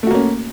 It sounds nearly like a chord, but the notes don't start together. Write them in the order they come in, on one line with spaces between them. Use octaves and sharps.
A3 F#4 A#3 C#4